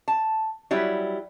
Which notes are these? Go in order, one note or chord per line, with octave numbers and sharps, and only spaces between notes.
A5
F#3 G3 E4